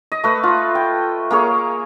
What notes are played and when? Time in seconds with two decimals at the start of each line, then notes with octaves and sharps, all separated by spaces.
0.12 D#5
0.24 A3 B4
0.43 F4
0.75 G5
1.31 A#3 G#4 C#5